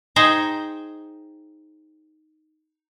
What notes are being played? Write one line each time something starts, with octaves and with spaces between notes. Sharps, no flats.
D#4 G#4 C5 D#5 G5